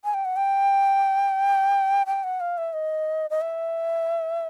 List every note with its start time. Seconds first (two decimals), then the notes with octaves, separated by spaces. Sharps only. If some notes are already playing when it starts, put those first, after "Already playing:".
0.04 G#5
0.14 G5
0.25 F#5
0.36 G5
2.07 G5
2.24 F#5
2.40 F5
2.58 E5
2.73 D#5
3.30 D#5
3.41 E5